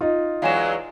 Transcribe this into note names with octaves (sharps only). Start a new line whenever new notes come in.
D#4 F4
E2 F#3 G#3 F5 G#5 E7